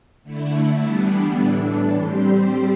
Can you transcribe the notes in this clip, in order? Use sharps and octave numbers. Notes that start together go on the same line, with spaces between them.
D3 A3 E4
E3 G3 B3 D4
A2 E3 A3 D4
G3 C4 G4 C5